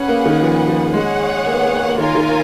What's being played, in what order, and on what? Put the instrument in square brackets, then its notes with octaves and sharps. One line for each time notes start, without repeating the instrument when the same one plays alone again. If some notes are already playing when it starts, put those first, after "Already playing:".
Already playing: [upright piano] C#4 [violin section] G#4 B4 F#5
[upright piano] A#3
D#3
F3
F3
[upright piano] G#3 [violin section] G#4 C#5 F#5
[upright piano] A#3
B3
A#3
B3
A#3
B3
A#3
[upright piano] D#3 [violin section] F4 A#4 C#5 G#5
[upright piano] D#3